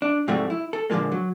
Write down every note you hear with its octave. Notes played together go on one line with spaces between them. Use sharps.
D4
G#2 C3 F3 G3 A3 F#4
E4
A4
A#2 D3 D#3 F3 G#3 A#3
F#3